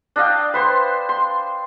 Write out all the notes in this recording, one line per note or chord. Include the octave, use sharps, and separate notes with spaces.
D4 D#5 F5 G5
B4 C5 C6
C6